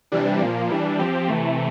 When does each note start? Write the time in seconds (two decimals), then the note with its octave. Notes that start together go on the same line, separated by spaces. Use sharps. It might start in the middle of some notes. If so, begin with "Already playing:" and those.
0.12 C3 E3 G3 D4
0.41 A#2 F3 A#3
0.70 E3 G3 D4
0.99 F3 C4 G4
1.28 C3 E3 A3